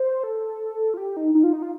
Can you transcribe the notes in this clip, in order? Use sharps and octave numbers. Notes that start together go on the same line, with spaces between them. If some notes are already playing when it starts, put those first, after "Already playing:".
Already playing: C5
A4
F4
G4
D#4
D#4
F4
D#4
F4